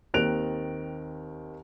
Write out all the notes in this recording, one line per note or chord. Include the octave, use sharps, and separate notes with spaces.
D#2 D#3 C4 F#6 D7 F7